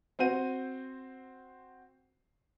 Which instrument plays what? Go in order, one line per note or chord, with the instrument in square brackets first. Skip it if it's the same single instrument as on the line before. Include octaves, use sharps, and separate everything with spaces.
[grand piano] C4 F#4 C5 D#7